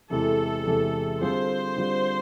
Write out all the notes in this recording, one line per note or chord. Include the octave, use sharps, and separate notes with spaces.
E2 C3 E3 G#3 A4
E2 C3 E3 G#3
D3 G3 C4 F4 G#4 C5
D3 G3 C4 F4 G#4